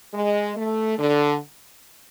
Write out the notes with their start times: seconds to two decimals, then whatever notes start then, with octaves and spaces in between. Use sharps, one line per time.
0.14 G#3
0.57 A3
0.99 D3